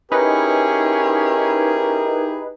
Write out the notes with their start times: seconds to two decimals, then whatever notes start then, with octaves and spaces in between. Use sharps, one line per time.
0.12 C#4 D#4 E4 G4 G#4 A#4 B4